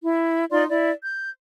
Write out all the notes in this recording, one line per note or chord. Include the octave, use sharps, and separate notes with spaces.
E4
D#4 F4 D5 C6
E4 D5
G6